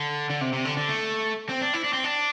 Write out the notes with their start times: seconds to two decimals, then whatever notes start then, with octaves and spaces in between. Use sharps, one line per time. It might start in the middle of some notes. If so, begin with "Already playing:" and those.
Already playing: D3
0.30 D3
0.41 C3
0.53 C3
0.65 D3
0.77 D3
0.89 A3
1.49 C4
1.61 D4
1.73 E4
1.84 D4
1.93 C4
2.04 D4